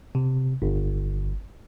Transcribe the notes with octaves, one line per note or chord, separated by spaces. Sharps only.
C3
G1